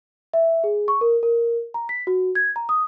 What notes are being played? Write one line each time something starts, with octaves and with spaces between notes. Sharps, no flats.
E5
G#4
C#6
A#4
A#4
A#5
B6
F#4
G#6
A#5
D#6